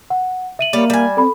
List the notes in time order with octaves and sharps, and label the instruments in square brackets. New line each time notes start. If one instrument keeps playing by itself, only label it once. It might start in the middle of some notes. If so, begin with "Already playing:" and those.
[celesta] F#5
E5 D#7 F#7
[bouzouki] G3 C#5 D5 [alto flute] A#3
[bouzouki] G3 G#5
[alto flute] C4 [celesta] A4 B5